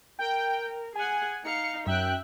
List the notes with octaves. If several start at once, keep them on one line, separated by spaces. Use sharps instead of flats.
A#4 G5
G#4 F#5 G#5
D#4 F5 C#7
F#2 E5 G5 F#6